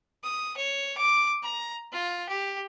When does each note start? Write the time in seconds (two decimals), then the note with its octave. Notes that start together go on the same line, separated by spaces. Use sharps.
0.24 D#6
0.57 C#5
0.97 D6
1.43 A#5
1.92 F4
2.29 G4